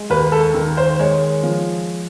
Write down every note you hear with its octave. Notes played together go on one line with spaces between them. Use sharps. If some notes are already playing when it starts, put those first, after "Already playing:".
Already playing: G#3
D#2 B4
A4
D#3
C5
G#3 C#5
F3